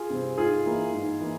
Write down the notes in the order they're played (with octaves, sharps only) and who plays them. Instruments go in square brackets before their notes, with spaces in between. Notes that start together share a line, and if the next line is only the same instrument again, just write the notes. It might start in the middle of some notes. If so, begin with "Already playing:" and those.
Already playing: [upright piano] F4 G#4
C3 G3 C4
G#2 F4 G#4
E3 A#3 E4
G#2
E3 A#3 E4